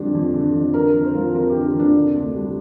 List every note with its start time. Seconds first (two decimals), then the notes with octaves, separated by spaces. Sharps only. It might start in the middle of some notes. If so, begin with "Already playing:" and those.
Already playing: F2 D3 G3 D4
0.14 F2
0.34 D3
0.55 F2
0.74 D3 A#4
0.94 F2
1.04 C5
1.15 F3
1.34 F2 A#4
1.50 G4
1.55 D3
1.74 F2
1.79 D4
1.95 C3
2.14 D2
2.34 G3